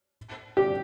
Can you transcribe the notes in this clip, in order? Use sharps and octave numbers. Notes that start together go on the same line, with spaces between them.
G4